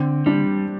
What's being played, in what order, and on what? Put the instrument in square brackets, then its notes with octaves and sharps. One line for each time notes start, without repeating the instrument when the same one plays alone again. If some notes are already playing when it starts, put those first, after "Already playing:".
Already playing: [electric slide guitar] D3 [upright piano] C4
[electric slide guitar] G3 [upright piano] D4